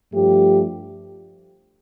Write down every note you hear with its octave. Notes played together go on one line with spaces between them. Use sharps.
G2 F3 A3 D4 G4